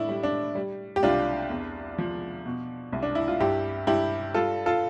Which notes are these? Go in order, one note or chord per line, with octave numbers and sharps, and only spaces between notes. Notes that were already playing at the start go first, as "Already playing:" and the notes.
Already playing: A2 D4 E4
G3
D4
G3
G4
C2 D4 F4
E2
F3
B2
C2
D4
E4
F4
G2 E4 G4
G2 E4 G4
G3 F4 A4
F4 A4